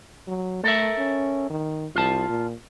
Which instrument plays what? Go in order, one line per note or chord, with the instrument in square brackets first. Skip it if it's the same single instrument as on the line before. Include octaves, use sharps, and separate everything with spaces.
[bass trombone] F#3
[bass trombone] A3 [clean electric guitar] A4 A#4 E5
[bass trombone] C#4
D#3
[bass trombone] C2 [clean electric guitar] F4 A5
[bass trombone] A#2